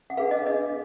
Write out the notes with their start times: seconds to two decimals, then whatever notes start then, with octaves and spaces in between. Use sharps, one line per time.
0.10 F#5
0.17 D4 G#4 B4 F5
0.31 D#5
0.46 D4 G#4 B4 D#5